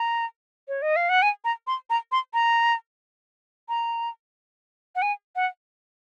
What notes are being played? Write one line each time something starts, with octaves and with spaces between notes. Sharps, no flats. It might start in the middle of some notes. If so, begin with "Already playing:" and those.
Already playing: A#5
C#5
D#5
F5
F#5
G#5
A#5
C6
A#5
C6
A#5
A#5
F#5
G#5
F#5